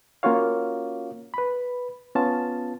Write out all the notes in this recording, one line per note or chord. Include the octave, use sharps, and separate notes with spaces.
A#3 C#4 F4 F#4 C#5 F5
B4 B5
B3 C#4 F4 A5